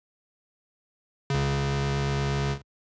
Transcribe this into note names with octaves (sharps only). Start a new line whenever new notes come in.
C#2 C#3